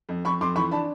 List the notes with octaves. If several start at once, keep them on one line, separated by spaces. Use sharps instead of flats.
F2
F2 B5 C#6
F2 C6 D6
E3 B5 C#6
D4 A5 B5